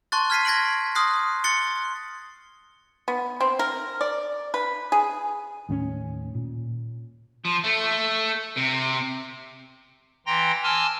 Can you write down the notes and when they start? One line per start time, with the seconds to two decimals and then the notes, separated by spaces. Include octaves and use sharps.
0.12 A5 C6 C#6 F#6 A6
0.30 F6 G#6 B6 C7 D#7
0.45 G#6 A#6 B6 D7 F#7
0.95 C6 D#6 F6 F#6 A#6 C7
1.44 C6 F#6 A6 C#7 G7
3.08 B3
3.40 C4
3.59 A#4
4.01 D5
4.54 B4
4.92 G#4
5.69 D#2 A2 B3 C#4
6.35 A#2
7.45 F3
7.64 A3
8.57 C3
10.26 E3 G5 A#5 C6 A#6
10.63 G#5 A5 C6 D6 E6 F6